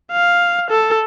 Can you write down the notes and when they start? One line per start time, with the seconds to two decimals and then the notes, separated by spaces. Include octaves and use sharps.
0.12 F5
0.70 A4